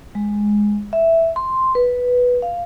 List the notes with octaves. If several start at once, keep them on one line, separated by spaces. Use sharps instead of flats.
G#3
E5
C6
B4
F5